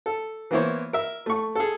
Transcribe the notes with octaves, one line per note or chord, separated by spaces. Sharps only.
A4
E3 A#3 B3 E4 C5 C#5
A#4 E5
A3 C#6
G#4 A4